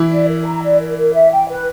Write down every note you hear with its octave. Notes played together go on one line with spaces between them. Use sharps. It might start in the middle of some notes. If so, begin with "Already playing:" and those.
Already playing: E3 E4
D5
A#4
A#5
D5
A#4
A#4
E5
G5
B4